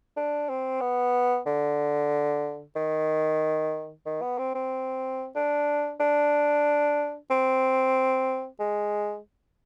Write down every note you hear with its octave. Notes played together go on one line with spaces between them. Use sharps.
D4
C4
B3
D3
D#3
D#3
B3
C4
C4
D4
D4
C4
G#3